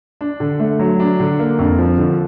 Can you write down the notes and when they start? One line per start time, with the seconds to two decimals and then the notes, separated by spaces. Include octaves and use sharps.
0.21 D4
0.40 D3
0.60 A3
0.79 F#3
1.00 D4
1.20 D3
1.39 A#3
1.59 F2
1.78 F3
1.98 D3